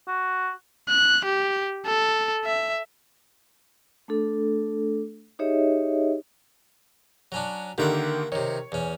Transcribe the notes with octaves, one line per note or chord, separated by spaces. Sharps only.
F#4
F#6
G4
A4
E5
A3 D4 A4
D#4 G4 G#4 C#5 D#5 E5
F#3 C#4 D4
D3 D#3 A#3 G4 E5 F#5
C3 D#3 C#5
E2 C#4